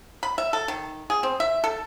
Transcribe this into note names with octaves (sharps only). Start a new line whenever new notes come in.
B5
E5
A4
D#3
G#4
C4
E5
A4